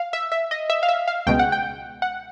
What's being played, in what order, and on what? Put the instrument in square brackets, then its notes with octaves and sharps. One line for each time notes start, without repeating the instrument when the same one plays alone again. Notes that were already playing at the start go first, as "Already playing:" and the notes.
Already playing: [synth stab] F5
E5
E5
D#5
E5
F5
E5
F5
C#2 B2 G#3 G5
F#5
G5
F#5